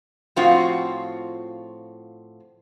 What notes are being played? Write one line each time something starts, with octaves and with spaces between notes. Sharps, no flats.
A2 F3 C4 F4 F#4